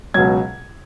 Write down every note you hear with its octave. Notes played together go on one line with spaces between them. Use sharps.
C#2 B2 F#3 G#6